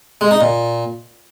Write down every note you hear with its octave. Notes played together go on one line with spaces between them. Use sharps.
G#3
D#4
A#2